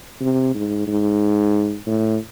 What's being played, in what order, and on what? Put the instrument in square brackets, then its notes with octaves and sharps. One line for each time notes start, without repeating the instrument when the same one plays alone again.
[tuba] C3
G#2
G#2
A2